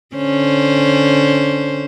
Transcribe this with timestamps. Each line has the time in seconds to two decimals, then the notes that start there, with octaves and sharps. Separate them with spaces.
0.16 D3 C#4 C5